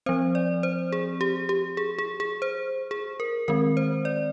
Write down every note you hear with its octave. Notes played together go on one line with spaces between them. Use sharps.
F3 C4 C5
D5
C5
G#4
G4
G4
G#4
G#4
G#4
C5
G#4
A#4
D#3 G#3 C4 A#4
C5
D5